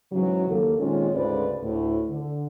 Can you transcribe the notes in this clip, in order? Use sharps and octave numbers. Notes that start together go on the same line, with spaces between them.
G#2 C#3 E3 F#3
D#2 A#3 A4
A#2 D#3 G#3 C4 C#4 F4
D2 G#2 C#3 B4 C5 D5
D2 A2
D3